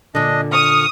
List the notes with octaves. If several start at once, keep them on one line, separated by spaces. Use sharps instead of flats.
A#2 D3 D4 D#5
C#6 D#6 F6